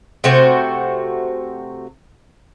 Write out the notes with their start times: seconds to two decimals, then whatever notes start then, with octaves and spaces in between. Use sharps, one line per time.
0.24 C3 A3 F#4 C5